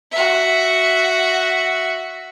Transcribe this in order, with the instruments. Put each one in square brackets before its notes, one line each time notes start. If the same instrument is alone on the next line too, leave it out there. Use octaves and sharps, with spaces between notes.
[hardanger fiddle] F#4 E5